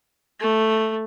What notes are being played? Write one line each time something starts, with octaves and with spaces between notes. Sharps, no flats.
A3